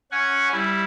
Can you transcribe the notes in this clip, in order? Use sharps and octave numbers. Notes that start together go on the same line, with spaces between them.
C#4 F#5 G#5
G3 E4